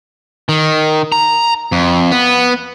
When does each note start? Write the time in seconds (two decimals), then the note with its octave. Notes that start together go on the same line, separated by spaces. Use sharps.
0.49 D#3
1.12 A#5
1.72 F2
2.11 B3